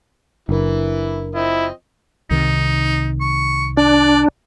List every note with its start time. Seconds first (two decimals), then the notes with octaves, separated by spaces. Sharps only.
0.49 F#1 E3 D4 E4 A#4
1.35 F3 C4 E4 D#5
2.31 C2 C3 D#3 D#4
3.21 C#6
3.77 D4 D5